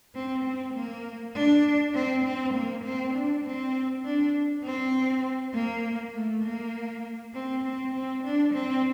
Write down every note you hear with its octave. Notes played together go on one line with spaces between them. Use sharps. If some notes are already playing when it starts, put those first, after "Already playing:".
C4
C4
A#3
D4
C4
C4
A#3
C4
D4
C4
D4
C4
A#3
A3
A#3
C4
C4
C4
D4
C4